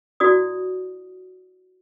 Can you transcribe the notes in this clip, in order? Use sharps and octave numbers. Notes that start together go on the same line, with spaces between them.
E4 F#4 D5 D#6